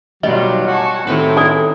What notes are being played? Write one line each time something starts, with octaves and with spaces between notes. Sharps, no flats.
B2 D#3 F#3 G3 F4 D#5
F#4 G#5 A5 C#6
A2 C3 D#3 C4 E4 B4
A4 D5 G#5